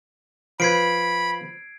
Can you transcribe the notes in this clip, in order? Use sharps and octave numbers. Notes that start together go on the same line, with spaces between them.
F3 B4 B5 G#6 C7 D7